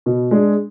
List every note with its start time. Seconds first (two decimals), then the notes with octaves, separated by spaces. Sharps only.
0.06 B2
0.31 G#3 D4 G#4